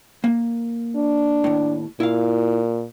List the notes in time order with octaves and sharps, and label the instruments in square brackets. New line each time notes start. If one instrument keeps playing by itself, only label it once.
[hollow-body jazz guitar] A#3
[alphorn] D4
[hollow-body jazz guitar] D#2 A2
[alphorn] A#2 [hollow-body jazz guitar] E4 F5